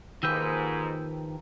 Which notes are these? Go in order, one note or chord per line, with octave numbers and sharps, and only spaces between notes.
G#2 D#3 F3 A#3 G4 B4 E6 G6